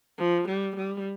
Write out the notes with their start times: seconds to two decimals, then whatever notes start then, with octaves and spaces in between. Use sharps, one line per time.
0.19 F3
0.48 G3
0.76 G3